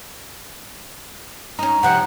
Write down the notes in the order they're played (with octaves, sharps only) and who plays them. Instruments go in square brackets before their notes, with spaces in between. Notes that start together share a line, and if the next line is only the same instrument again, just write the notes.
[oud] C#4 D#4 [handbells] A#5
[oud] C3 F3 E4 [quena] F#5